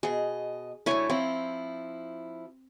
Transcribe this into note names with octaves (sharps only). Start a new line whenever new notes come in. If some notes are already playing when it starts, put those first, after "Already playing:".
B2 G#4 D#5
F#2 D3 A3 E4 C#5 G#5
F3 C4 E4